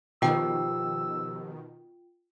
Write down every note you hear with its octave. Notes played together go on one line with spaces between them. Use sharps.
B2 D#3 F3 F4 G4 G5 E6